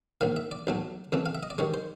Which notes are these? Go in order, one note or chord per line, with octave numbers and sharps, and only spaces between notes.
A#1 G#2 D#3 F5
E5
D5
B1 A2 F#3 A3
F2 C#3 E3 A3
F5
E5
D#5
D5
G2 D#3 G#3 C#5
C5